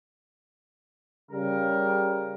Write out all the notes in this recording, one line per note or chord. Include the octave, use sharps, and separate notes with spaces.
C#3 G3 A#4